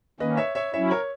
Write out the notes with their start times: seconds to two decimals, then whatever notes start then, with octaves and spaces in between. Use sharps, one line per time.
0.20 D#3 A#3 C#4 B4 D#5
0.37 C#5 E5
0.55 C#5 E5
0.73 F#3 C#4 E4 C#5 E5
0.91 A#4 C#5